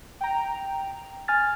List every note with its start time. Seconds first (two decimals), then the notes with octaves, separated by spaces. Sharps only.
0.21 G5 A#5
1.28 G#5 F6 A6